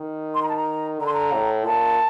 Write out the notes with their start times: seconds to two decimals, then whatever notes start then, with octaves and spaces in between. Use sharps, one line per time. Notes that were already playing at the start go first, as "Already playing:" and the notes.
Already playing: D#3
0.34 C6
0.43 A#5
0.49 A5
0.56 A#5
1.00 D3 A#5
1.06 C6
1.13 A#5
1.33 A2
1.65 A#2 A5